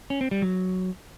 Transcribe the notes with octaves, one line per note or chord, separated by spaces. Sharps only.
C#4
C4
G3
F#3